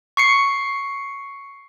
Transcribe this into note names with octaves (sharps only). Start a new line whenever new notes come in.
C#6 C7 C#7